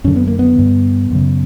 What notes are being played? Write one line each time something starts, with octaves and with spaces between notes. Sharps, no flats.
F#2 D3 C#4
B3
A#3
B3
G2 D3
F#2 C#3